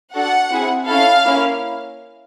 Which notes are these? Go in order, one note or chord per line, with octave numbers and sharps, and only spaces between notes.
D4 F#4 A4 F#5
C4 E4 G#4
C#4 E4 A4 F5
A#3 C#4 E4